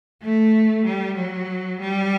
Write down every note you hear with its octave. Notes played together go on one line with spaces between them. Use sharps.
A3
G3
F#3
G3